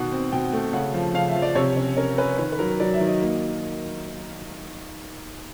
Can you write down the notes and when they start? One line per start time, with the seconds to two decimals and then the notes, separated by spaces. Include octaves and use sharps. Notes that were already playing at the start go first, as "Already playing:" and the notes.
Already playing: B2 D#3 F#5
0.12 C4
0.32 B2 G5
0.53 A3
0.73 C#3 F#5
0.94 F3
1.14 C#3 F5
1.28 E5
1.35 F3
1.42 D5
1.55 C3 C#5
1.77 C#4
1.97 C#4 A#4
2.18 C#4 B4
2.38 D#3 B4
2.52 B4
2.59 F#3 A#4
2.80 F#3 D5
2.94 E5
3.01 D#3
3.07 D#5
3.21 A#3